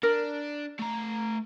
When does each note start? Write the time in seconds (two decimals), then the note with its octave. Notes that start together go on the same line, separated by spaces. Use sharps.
0.03 D4 A#4
0.79 A3 A#5